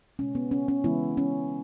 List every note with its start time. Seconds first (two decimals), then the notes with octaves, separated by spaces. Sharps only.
0.19 B2 G#3 C#4
0.35 B3
0.51 C#4
0.68 C#4
0.84 C#3 E3 G#3 B3 E4
1.17 C#4